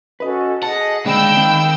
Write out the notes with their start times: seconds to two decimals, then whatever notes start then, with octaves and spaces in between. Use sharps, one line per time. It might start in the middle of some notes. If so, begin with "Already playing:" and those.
0.20 C#4 F#4 A4 B4 D#5
0.63 G#4 D#5 F#5 A5
1.05 D3 D#3 G#3 C4 F5 G5 B5 E6
1.37 D#3 C4 D#5 F5